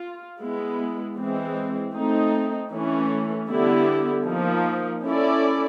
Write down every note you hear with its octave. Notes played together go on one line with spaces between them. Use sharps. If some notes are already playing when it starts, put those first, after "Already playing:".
Already playing: F4
G#3 B3 E4
E3 G#3 C4
A3 C4 D#4
E3 A3 C#4
D3 G3 B3 E4 G4
F3 A#3 D#4
C#4 E4 A4 D5